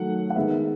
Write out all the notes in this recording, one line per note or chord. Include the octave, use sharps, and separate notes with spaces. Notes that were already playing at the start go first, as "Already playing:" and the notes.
Already playing: D#3 F#3 A3 F#5
F#5
D#3 G#3 B3 E5